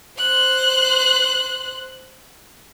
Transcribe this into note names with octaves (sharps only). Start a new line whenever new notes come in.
C5 F#6